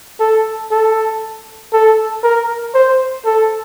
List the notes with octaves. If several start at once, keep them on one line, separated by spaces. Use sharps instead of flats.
A4
A4
A4
A#4
C5
A4